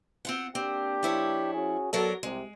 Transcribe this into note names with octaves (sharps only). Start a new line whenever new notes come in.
C4 F4 F#5
A#3 C4 D4 G4
F3 E4 C#5
C#4 F#4 G#4
F#3 B3 A4 A#4 D5
C2 C3 G#3